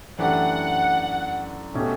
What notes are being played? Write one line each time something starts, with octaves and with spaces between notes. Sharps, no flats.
F#2 E3 A3 D4 G4 F#5
B2 A3 C#4 G4